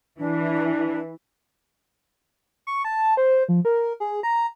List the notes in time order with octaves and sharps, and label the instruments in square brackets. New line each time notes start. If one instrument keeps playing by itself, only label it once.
[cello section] E3 [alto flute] D4
[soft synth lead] C#6
A5
C5
F3
A#4
G#4
A#5